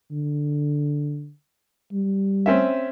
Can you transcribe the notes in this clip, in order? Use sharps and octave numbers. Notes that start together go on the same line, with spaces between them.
D3
G3
C4 C#4 E5